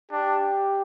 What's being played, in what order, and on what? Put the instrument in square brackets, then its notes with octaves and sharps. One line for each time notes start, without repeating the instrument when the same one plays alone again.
[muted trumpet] D4 [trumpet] G4